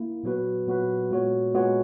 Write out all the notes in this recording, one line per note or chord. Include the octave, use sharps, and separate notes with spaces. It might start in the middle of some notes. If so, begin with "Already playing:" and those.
Already playing: A#3 E4
A#2 F#3 B3 F#4 B4
A#2 F#3 B3 F#4 B4
A#2 G#3 B3 F#4 C#5
A#2 G#3 B3 F#4 C#5